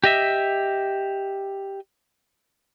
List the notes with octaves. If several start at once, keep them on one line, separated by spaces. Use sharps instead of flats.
G4 D#5 E5